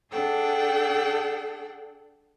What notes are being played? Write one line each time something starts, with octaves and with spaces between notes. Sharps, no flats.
D4 G#4 A4 F#5 G5